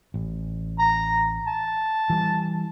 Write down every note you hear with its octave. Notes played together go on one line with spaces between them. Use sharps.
A1
A#5
A5
E3 G3